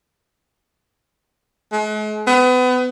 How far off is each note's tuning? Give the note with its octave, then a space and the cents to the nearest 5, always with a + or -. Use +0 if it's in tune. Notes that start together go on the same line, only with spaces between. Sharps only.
G#3 +45
B3 +30